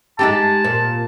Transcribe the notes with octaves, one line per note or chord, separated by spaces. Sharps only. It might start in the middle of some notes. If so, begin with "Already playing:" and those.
G#3 D#4 G4 A5
A#2